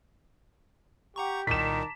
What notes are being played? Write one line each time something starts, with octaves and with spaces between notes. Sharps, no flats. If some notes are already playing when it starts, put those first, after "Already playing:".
G4 F#5 A#5 C#6
C2 A#2 D#3 A5 A#5 D6 B6 E7